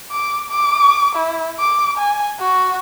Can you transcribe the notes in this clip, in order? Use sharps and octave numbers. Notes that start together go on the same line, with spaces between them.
D6
D6
E4
D6
G#5
F#4